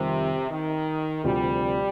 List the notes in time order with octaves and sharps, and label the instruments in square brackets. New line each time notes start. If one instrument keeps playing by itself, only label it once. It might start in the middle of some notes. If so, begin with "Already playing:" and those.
Already playing: [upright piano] F2 D#3 G3 C4 [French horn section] C3
[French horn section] D#3
[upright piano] D2 C3 F3 [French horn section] G3